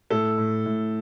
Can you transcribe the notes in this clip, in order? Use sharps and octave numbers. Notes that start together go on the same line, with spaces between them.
A2 A4
A2
A2